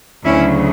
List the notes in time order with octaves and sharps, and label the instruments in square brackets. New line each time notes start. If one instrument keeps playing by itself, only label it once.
[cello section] D2 C#3 F#3 C#4 E4